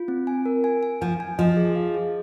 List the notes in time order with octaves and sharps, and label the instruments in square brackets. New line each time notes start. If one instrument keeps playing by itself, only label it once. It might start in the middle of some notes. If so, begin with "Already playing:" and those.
Already playing: [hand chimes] F4
C4
G#5
A#4
G#5
G#5
[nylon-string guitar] F3 [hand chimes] G#5
[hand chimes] G#5
[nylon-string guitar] F3 [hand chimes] D#5
[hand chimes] G#4
F5
G#4